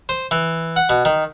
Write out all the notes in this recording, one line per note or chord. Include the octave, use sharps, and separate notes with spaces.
C5
E3
F#5
B2
D#3